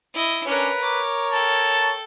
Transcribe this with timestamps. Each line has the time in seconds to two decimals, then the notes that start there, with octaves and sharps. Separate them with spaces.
0.14 E4 D#5
0.46 C#4 D4 A#4 B4 C#5
0.83 A#4 C#5 D6
1.33 A4 G5 A5